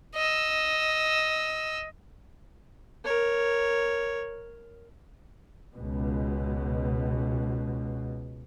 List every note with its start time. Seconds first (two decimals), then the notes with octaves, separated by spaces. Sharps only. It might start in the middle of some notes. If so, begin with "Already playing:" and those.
0.15 D#5 E6
3.04 A#4 C#5
5.75 C#2 B2